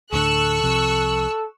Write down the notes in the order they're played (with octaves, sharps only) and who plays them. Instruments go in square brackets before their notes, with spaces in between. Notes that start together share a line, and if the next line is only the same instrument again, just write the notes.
[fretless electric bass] D2 A2 D3 [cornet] A4 [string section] C#6 E6 F#6
[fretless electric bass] C2 C3 F3